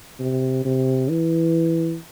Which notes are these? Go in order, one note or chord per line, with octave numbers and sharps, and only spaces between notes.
C3
C3
E3